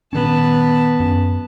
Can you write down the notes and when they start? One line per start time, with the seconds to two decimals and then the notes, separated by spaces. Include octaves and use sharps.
0.13 A#2 D#3 B3 C#4 A5
1.00 F#2 C#4